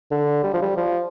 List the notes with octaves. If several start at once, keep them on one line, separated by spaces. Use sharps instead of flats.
D3
G3
F3
G3
F3